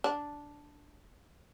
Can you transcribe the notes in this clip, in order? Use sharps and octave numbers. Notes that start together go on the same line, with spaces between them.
D4